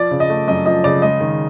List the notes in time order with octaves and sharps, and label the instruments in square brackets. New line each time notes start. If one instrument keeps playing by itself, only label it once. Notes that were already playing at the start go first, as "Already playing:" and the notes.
Already playing: [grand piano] F3 D5
C#3
D#5
A3
F#2 D#5
F3 D#5
C#3 D5
G#3 D#5
D#3